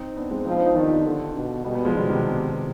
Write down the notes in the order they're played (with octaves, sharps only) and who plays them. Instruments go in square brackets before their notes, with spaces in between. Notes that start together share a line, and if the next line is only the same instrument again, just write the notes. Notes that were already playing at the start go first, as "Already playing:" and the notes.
Already playing: [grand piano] C4 D#4
B3 D4
G#3 C4
[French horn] F3 [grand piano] C4 D#4
[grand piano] B3 D4
C4 D#4
[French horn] D#3 [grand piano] D4 F4
[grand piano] G4
D4 F4
[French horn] D3
B2
[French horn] B2 [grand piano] G3 B3
[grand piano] G3 B3
F3 G#3
[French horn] B2 [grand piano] D#3 G3
[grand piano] C3 D#3